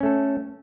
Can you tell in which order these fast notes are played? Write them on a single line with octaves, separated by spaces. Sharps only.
C#4 A3 A4